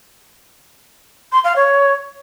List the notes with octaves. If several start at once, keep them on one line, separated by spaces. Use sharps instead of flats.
C6
F5
C#5